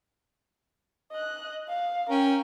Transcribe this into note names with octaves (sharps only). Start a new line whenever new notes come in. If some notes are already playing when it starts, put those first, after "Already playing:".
D#5 F#6
F5
C#4 A#4 G5